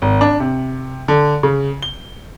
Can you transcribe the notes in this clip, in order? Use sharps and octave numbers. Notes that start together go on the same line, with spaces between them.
G#1
D4
C3
D3
C#3
G7